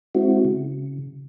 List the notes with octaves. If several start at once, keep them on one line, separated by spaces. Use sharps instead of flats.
G#3 C4 E4 F#4
C#3